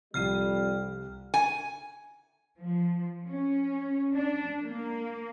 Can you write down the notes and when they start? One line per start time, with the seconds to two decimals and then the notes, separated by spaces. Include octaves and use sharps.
0.14 C2 F2 G3 F6 C7 D#7
1.34 G#5
2.59 F3
3.27 C#4
4.14 D4
4.63 A#3